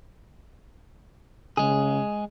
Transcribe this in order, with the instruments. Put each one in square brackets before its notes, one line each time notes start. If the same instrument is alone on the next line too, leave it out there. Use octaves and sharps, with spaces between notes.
[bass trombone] C#3 [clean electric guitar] G#3 G#4